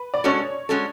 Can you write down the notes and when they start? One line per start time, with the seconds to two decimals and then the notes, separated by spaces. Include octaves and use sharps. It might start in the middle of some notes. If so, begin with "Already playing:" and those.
Already playing: B4
0.14 D5
0.24 G#3 C#4 F#4 A4 C#5
0.69 G#3 C#4 F#4 A4